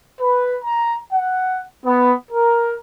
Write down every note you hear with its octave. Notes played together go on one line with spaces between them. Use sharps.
B4
A#5
F#5
B3
A#4